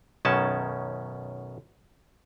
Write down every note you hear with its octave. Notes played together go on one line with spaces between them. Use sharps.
B1 F#2 B2 D#3 C#4 A5